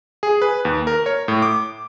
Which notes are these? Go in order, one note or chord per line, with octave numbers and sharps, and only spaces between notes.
G#4
B4
D#2
A#4
C#5
A2
D6